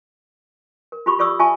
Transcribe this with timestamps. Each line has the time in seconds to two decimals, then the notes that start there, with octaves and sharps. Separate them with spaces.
0.92 A#4
1.06 F4 G4 B5 C#6 D6
1.19 F4 A4 D5 C#6 D#6 E6
1.39 F4 E5 G#5 A5 C#6